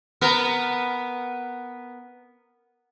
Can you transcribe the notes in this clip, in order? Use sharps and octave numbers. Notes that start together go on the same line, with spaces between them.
B3 A#4